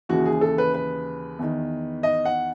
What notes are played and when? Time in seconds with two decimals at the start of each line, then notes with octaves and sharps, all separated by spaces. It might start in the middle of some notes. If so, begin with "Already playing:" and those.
0.09 D#2 C#3 E3 F#4
0.26 G#4
0.41 A4
0.58 B4
0.74 B4
1.39 E2 D#3
2.03 D#5
2.25 F#5